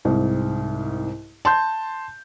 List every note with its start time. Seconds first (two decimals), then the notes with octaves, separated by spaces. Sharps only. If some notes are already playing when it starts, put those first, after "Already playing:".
0.05 C2 G#2
1.45 A5 C6 G6